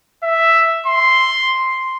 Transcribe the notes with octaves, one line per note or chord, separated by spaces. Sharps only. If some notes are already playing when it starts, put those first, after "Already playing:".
E5
C6